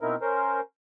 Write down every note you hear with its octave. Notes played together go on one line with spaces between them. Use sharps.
B2 C4 D#4 E4 A#4
C#4 A#4 C5